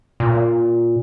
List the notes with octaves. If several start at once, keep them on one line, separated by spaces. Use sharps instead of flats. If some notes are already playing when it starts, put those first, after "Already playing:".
A#2